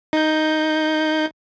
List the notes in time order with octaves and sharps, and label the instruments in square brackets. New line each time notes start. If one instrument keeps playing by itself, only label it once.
[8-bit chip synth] D#4 G6